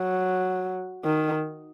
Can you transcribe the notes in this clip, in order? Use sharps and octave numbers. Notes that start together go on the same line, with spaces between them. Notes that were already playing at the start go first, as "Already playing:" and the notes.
Already playing: F#3
D#3